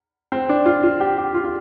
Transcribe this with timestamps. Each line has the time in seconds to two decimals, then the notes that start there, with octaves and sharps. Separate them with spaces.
0.32 C4
0.49 D4
0.66 F4
0.84 F4
1.00 G4
1.18 G4
1.34 F4
1.44 F4